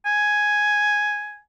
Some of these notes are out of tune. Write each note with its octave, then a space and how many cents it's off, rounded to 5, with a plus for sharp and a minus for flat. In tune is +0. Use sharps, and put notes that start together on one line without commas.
G#5 +5